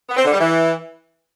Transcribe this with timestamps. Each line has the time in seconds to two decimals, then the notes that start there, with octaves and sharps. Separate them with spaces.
0.09 B3
0.17 C4
0.25 D3
0.32 G3
0.40 E3